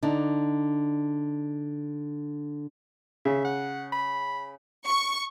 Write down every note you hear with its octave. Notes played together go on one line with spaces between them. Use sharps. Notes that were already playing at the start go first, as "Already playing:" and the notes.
D3 D4 D#4
C#3 E5
F#5
B5
C#6